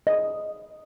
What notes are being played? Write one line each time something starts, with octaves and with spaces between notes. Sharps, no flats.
D#5